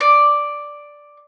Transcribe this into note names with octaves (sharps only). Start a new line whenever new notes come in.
D5